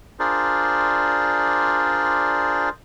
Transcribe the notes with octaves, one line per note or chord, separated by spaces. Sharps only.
D4 F4 G#4 A#4 C5 D5